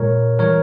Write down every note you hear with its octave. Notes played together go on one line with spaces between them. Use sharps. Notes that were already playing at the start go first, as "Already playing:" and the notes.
Already playing: A#2 G#3 A#4 C#5
E3 G3 A#4 C#5